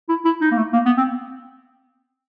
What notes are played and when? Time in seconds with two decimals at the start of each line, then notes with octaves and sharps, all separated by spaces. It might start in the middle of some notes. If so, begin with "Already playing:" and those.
0.09 E4
0.25 E4
0.41 D#4
0.52 A#3
0.57 A3
0.73 A#3
0.86 B3
0.97 C4